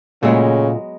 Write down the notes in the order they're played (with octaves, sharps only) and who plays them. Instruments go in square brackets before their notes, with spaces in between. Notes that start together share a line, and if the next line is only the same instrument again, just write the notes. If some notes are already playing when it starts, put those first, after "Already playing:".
[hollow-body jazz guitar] A#2 A3 [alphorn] C#3 [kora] F#3 G#3 B3